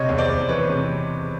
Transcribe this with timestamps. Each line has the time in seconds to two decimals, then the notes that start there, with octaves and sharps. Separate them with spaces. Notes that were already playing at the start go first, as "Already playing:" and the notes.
Already playing: C3 C#5 D#5
0.09 E2
0.18 C5 D5
0.29 E2
0.49 E3 B4 C#5
0.70 C3